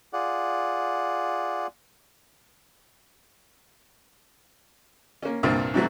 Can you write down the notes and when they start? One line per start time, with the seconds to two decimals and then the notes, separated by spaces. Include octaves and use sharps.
0.13 F4 G#4 D5 F#5
5.23 A#3 C#4
5.43 C2 G2 A#2 A#3 C4
5.74 G#2 C3 E3 F#3 A3